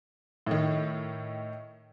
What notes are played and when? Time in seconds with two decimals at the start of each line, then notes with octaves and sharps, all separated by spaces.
0.47 A2 D#3